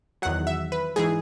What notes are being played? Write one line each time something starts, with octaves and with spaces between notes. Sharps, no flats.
E2 D#3 F#3 F#5
E5
B4
G#2 E3 G#4